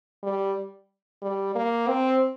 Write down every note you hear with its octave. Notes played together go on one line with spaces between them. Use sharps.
G3
G3
A#3
C4